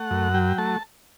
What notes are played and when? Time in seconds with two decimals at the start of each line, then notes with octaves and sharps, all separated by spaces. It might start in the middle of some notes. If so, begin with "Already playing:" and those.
Already playing: A3 F#5
0.11 F#2
0.34 F#3 G5
0.58 A3 A5